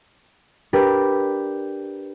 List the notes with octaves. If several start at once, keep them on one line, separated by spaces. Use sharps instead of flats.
D4 G4 A#4 B4